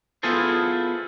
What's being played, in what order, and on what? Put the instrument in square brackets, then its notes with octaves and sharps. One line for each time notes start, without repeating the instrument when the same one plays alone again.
[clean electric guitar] B3 E4 F4 G#4 A4 C5